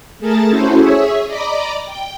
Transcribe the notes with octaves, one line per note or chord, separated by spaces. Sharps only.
A3 G#4 A#4 A5 A6
C#4 E4 F#4 A4 C5
G#4 C#5 E5
D5 D#5 A#5 B5 D6
G5